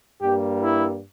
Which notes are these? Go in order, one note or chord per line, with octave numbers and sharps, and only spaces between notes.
G2 G3 A#3 G4
E4